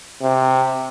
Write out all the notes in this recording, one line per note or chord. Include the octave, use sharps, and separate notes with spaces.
C3